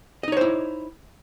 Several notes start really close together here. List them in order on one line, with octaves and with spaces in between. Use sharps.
D#5 D#4 C#5 C5 E4